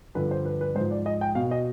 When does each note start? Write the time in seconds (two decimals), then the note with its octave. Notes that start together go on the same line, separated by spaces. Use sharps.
0.15 G2 D3 F3 B4
0.31 C5
0.45 B4
0.61 B4
0.75 G#2 C5
0.79 F3
0.91 D5
1.06 D#5
1.21 G5
1.35 B2 F5
1.51 D#5